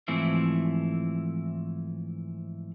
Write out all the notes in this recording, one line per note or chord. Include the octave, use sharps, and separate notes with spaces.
G#2 E3 F3 A3 C4 E4